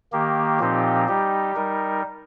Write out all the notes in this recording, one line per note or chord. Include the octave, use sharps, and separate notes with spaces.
D#3 A#3 G4
A#2 F3 C4 D#4 G4
G3 D#4 G4
G3 D#4 A#4